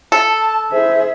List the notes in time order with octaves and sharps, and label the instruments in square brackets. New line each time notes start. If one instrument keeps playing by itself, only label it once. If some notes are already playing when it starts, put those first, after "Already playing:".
[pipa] A4 [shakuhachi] A5
[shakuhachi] E4 [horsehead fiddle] G#4 E5 [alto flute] C5